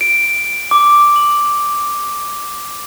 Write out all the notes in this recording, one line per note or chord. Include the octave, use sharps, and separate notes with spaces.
D7
D6
F#7